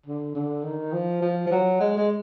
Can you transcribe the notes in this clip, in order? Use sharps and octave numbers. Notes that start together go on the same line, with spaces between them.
D3
D3
D#3
F3
F3
F3
F#3
G#3
G#3